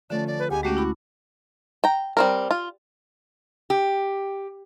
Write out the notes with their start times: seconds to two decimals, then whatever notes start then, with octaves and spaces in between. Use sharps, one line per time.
0.10 D3 F3 A3 C#4 D5
0.27 D5
0.39 B4
0.51 D2 B3 G4 G#4 D#5 G#5
0.63 G#3 A3 C#4 F#4 G4
0.77 E4 B5 D6
1.84 G5 A#5
2.17 G3 C4 A#4
2.51 F4
3.70 G4